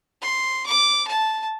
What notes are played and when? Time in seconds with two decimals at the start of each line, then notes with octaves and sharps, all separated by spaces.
0.21 C6
0.66 D6
1.07 A5